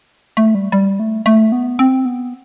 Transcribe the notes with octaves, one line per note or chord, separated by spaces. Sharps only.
A3
G3
G3
A3
A3
B3
C4
B3